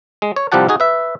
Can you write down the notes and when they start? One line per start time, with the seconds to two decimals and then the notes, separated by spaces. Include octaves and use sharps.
0.22 G#3
0.36 C#5
0.52 C2 F3 G3 G4 F#5 A5
0.68 D#4 F#4 G#4
0.80 B4 E5